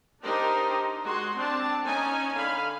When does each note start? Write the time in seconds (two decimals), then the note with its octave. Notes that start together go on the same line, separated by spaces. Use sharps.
0.23 D4 D#4 G4 A#4 C5
1.05 G#3 F#4 F#5 C6
1.36 C4 D4 A5
1.85 C#4 D#4 G#5
2.35 D3 F5 B5